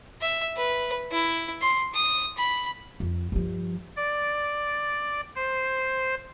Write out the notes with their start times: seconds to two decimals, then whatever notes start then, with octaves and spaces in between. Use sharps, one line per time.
0.22 E5
0.57 B4
1.12 E4
1.62 C6
1.94 D#6
2.37 B5
3.00 F2
3.32 G2 F3
3.97 D5
5.35 C5